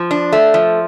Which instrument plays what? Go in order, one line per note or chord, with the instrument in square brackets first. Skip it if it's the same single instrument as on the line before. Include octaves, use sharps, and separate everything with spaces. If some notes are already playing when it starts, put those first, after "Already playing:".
Already playing: [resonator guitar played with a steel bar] F3
D4
A3
F3